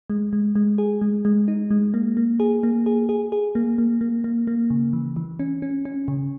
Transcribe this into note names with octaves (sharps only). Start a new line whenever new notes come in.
G#3
G#3
G#3
G#4
G#3
G#3
D#4
G#3
A#3
A#3
G#4
A#3
G#4
G#4
G#4
A#3
A#3
A#3
A#3
A#3
C#3
E3
E3
C#4
C#4
C#4
C#3